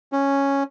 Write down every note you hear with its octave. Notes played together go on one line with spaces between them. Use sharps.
C#4